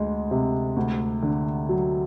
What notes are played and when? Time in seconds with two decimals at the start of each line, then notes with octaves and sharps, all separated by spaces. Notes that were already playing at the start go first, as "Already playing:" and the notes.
Already playing: D2 G#3
0.31 C3
0.76 D2
1.22 D3
1.69 F#3